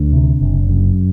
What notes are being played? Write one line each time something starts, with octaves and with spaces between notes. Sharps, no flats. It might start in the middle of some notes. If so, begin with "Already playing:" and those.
Already playing: D2 D4
C3
F#1
F#2